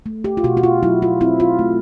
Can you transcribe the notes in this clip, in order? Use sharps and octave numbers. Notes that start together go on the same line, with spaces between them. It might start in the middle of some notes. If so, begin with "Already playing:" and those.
A3
G4
F4
B2 F#4
F#4
F4
F#3 E4
F4
C4 E4
F4
A3